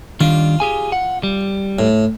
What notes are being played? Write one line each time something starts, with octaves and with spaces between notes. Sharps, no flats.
D#3 G3 D4 F4
G4 G#4 G#5
F#5
G3
A2